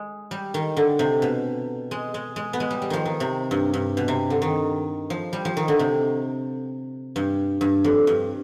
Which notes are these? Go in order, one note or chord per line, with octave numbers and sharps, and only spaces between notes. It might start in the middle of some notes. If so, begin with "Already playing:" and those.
Already playing: G#3
G3
D#3
D3
C3
B2
G#3
G#3
G#3
B3
G#3
G3
G3
D#3 F3
D#3
C3
G2
G2
B2
C3
D3
D#3
F3
G3
F3
D#3
D3
C3
G2
G2
F2
G2